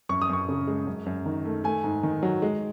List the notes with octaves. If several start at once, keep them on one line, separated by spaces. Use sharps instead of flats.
F#2 C#6
D#6
F#2 C#6
C#3
G#3
F#2
F#2
D#3
A3
A3 G#5
G#2
D#3
F#3
G#3